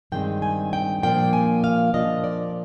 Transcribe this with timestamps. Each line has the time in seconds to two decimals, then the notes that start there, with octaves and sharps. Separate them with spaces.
0.12 G2 D#3 G#3 C4 G5
0.42 G#5
0.73 G5
1.03 A#2 F3 A#3 D4 G5
1.33 G#5
1.64 F5
1.94 A#2 F3 A#3 D4 D#5
2.24 D5